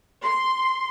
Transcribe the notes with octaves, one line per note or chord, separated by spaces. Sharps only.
C6